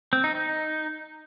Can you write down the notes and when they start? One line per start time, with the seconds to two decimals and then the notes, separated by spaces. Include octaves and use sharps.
0.13 C4
0.24 D#4
0.35 D#4